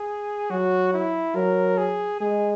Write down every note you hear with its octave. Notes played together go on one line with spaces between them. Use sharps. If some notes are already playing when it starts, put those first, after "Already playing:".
Already playing: G#4
F#3 F#4
E4
F#3 A#4
G#4
G#3 G#4